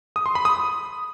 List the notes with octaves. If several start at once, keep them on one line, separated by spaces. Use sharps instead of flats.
D#6
C6
B5
D#6